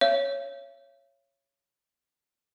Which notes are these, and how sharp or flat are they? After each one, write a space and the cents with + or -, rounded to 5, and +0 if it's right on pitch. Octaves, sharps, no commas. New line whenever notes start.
C#5 +0 E5 +45